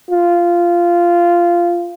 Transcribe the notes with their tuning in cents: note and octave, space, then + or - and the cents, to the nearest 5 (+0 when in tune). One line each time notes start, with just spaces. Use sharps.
F4 -10